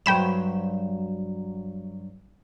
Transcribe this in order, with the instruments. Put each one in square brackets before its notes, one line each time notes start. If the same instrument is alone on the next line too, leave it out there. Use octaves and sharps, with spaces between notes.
[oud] G2 F#3 C5 [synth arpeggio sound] G5 B5 E7